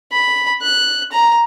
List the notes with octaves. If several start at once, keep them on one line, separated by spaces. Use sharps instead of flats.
B5
F#6
A#5